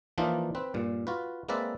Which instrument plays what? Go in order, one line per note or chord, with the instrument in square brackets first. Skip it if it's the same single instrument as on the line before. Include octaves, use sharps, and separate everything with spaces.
[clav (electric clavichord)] E3 F3 A#3 D4 D#4 F4
C4 B4
G2 A#2
F4 F#4 B4
G#3 A#3 C4 B4 D5 E5